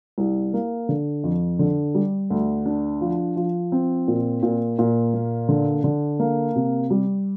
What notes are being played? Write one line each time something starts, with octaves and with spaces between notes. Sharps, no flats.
C2
A#3
D3
F2
D3
G3
D2
D4
F3
F3
C4
A#2
A#2
A#2
A#3
D3
D3
A#3
C3
G3